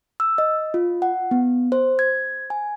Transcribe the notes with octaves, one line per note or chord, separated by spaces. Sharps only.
E6
D#5
F4
F#5
B3
C5
G#6
G#5